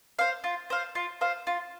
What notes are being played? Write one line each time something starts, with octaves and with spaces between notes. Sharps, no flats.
C5 F5
F4
C5 F5
F4
C5 F5
F4